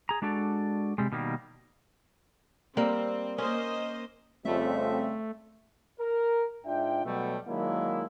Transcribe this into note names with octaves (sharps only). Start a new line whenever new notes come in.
G#4 A#5
G#3 D4 F#4 A4 D5
C3 G3 G#3
B2 D#3 G3 A#3
G3 A#3 C4
A#3 C#4 C5 D#5
F2 C#3 G3 A3 C4 E5
A#4
G#2 D4 F4 E5 G5
B2 F#3 G3 A3
D#3 F#3 G#3 A#3 D4 E4